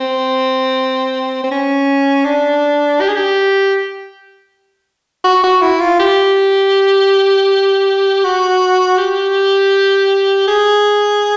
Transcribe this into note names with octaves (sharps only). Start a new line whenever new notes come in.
C4
C4
C#4
D4
G4
G#4
G4
F#4
F#4
E4
F4
G4
F#4
G4
G#4